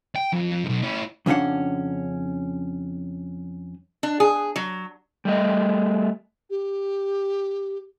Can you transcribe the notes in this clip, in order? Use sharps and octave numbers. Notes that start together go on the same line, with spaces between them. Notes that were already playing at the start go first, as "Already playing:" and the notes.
G5
F2
B1 G#2
C#4 E4
F2 C#3 C#4 D4 F#5
D4
G#4
F#3
G3 A3 D#5
G4